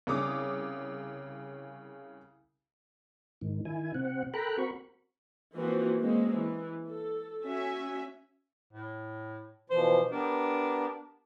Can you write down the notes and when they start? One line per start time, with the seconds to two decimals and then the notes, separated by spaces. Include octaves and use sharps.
0.07 C2 C#3 C#4 D6 D#6
3.41 G#2 D#3
3.65 D#3 E4 G#5
3.94 C3 C4 F#5
4.34 A4 A#4 G5 A#5 B5 F#6
4.58 C4 F#4 A#4 B5 C#6
5.55 E3 F3 A#3 C4 F#4
5.99 G#3 A#3 C4 C#4
6.33 E3
6.88 A4
7.45 C#4 F#4 E5 G#5
8.73 A2
9.70 B2 E3 F3 C5
10.11 B3 D4 G4 A#4